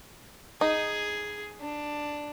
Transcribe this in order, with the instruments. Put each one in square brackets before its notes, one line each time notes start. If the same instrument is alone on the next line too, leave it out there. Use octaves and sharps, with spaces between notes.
[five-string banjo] D#4 [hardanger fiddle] G#4
[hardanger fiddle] D4